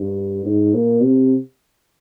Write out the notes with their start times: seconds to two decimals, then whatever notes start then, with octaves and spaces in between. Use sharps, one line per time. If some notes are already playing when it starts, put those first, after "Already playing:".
Already playing: G2
0.45 G#2
0.74 A#2
1.03 C3